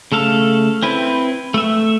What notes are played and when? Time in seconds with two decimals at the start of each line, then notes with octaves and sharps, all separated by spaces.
0.12 C#3 A3 A4 F5
0.83 C4 E4 B4
1.54 A3 E5